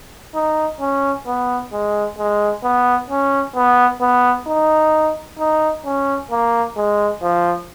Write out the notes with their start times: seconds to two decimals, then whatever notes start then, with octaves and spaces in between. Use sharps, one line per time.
0.35 D#4
0.80 C#4
1.26 B3
1.72 G#3
2.18 G#3
2.64 B3
3.10 C#4
3.55 B3
4.01 B3
4.47 D#4
5.39 D#4
5.85 C#4
6.31 A#3
6.77 G#3
7.22 F3